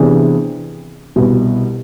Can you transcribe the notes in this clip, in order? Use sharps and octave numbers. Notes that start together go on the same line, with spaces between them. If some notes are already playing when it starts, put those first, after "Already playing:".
Already playing: C3 E3 B3 D4 G#4
C2 B2 B3